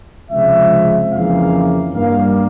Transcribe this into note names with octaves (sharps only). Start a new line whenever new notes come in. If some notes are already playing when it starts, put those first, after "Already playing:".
C#2 C3 F3 G#3 E5
F2 C#3 E3 A#3 F5
G2 G3 A#3 F5